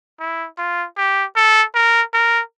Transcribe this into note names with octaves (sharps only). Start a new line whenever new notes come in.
E4
F4
G4
A4
A#4
A#4